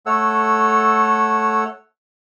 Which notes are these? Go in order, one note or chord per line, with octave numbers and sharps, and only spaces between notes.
A3 A4 C#5 F#5 E6